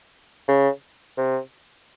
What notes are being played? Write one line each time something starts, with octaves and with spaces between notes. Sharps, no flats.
C#3
C3